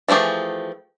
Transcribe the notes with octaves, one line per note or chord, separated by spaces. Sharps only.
E3 F3 A3 G4 G#4